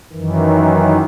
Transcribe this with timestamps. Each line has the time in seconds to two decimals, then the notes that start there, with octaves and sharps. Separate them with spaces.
0.12 F#2 D#3 E3